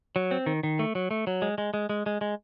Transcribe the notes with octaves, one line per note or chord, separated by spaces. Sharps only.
F#3
C4
D#3
D#3
A3
F#3
A3
F#3
G#3
G#3
G#3
G#3
G#3
G#3